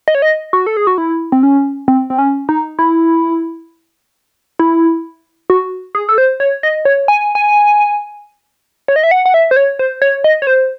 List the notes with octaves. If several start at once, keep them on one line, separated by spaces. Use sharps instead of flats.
D#5
C#5
D#5
F#4
A4
G#4
F#4
E4
C4
C#4
C4
C4
C#4
D#4
E4
E4
F#4
G#4
A4
C5
C#5
D#5
C#5
G#5
G#5
C#5
D#5
E5
F#5
F#5
E5
C5
C#5
C5
C#5
D#5
C#5
C5